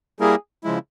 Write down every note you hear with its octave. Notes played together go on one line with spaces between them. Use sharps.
G3 A#3 E4 G#4 A#4
C#3 F3 G#3 E4